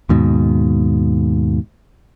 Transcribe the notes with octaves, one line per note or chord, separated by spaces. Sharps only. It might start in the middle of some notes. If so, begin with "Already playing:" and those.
D#2 G#2 B2